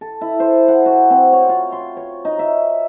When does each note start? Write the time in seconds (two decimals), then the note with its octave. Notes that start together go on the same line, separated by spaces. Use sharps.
0.01 A4
0.21 E4
0.40 C5
0.68 F#5
0.86 F#4
1.10 C4
1.33 C#5
1.49 F4
1.72 C6
1.97 C#5
2.25 D#4
2.39 E5